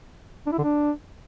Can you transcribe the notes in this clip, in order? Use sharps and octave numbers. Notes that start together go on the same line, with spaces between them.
D4
E4
D3
D4